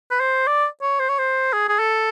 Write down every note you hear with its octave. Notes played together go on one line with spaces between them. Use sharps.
B4
C5
D5
C#5
C5
C#5
C5
G#4
G#4
A4